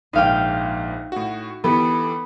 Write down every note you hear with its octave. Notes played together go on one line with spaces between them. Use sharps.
A#1 G#2 D#4 F5 G5
A2 F#4
E3 B3 G4 A4